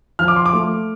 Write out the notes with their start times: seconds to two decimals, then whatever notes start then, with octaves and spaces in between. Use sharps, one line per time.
0.19 F3 F6
0.28 D6
0.36 C6
0.46 D6
0.53 A3